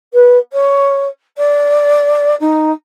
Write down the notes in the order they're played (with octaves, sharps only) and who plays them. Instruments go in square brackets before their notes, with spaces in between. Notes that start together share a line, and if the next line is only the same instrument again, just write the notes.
[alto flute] B4
C#5
D5
D#4